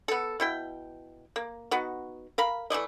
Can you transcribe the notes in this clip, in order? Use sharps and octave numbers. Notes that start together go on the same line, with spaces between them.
B3 A4
B2 E4 G5
A#3
B3 D#4 F#4
A#4 F5 B5
E3 A3 D5 D#5